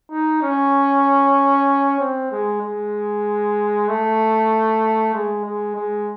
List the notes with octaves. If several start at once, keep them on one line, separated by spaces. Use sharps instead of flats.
D#4
C#4
C4
G#3
G#3
A3
G#3
G#3
G#3